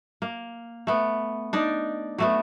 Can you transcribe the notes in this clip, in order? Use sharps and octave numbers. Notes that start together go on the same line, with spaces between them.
A#3
A3 B3
D4 D#4 D5
F#3 A3 B3